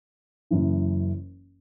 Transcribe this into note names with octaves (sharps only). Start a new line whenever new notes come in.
F#1 F#2 E3